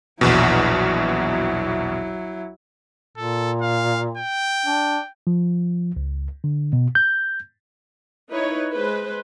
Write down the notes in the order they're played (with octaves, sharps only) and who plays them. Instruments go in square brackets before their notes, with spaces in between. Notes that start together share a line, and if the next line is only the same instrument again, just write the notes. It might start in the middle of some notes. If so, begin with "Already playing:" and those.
[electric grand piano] A#1 E2 B2 [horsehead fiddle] F#3 E4
[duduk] A#2 [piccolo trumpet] A4
[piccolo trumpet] F5
G5
[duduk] D4
[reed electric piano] F3
C#2
D3
B2
G6
[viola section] D#4 E4 B4 C#5
G#3 B4 C5